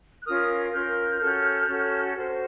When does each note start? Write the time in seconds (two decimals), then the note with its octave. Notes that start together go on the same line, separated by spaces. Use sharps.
0.20 F#6
0.25 C#4 F4 A#4 D#6 F6
0.72 C#4 F4 A#4 F6 G6
1.21 C#4 F#4 A4
1.68 C#4 F#4 A4
2.16 F#4 A4 C5